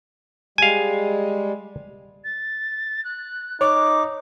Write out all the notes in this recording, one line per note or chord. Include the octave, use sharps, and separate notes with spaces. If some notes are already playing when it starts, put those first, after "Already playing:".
G3 G#3 F5 G#5
A6
F#6
D#4 C#5 D6